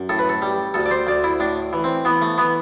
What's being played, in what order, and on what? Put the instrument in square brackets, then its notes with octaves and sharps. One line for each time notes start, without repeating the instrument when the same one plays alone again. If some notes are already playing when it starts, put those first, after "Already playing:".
Already playing: [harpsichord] F#2
A2 A4
B4
A4
G3
D2 A4
D5
C5
D2 D5
E4
A2 D4
E3
C4
E3 B3
A3
E3 B3